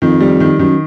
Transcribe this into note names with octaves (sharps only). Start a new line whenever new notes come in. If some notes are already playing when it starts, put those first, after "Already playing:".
F2 D#3
G3
D#3
F#2 D#3